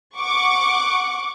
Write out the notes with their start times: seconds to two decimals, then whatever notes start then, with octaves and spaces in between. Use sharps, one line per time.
0.16 F#5 C#6 D6